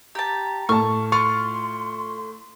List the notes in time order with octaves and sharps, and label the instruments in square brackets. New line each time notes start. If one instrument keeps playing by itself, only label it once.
[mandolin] G4 A5 [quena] A#5
[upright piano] A2 A5 [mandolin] C#6 F6
[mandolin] F4 F6 [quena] C6 [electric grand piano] C#6